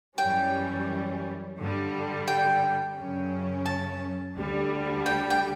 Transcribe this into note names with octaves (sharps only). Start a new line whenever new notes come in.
F#2 E3 G3 C#4 G5
G2 D3 G3
G5
F#2 C#3 F#3 C#4
A5
D2 D3 G3
G5
G5